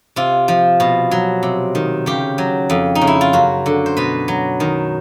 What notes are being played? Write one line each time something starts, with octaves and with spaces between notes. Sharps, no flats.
C3 F4
F3
B2
F#3
C3
D#3
C#3 G4
F#3
F2
D#4
C#3
E4
F4
F#2 F#4
D3
C5
B2 B4
F#3
D#3